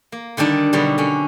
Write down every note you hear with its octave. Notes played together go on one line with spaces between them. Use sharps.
A#3
D3 D#3 G3 D4
B2 D3 F#3 G3
D3 C#4